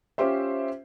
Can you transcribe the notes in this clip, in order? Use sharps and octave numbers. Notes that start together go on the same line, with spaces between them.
C#4 F4 G4 C5 E5